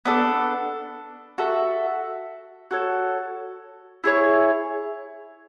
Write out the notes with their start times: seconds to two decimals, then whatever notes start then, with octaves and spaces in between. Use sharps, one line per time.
0.05 B3 D4 A4
1.38 F#4 A4 E5
2.71 F#4 A4 C#5
4.04 E4 G#4 C#5